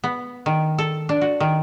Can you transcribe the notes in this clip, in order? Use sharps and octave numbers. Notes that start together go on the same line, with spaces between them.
B3
D#3
A4
D4
F#4
D#3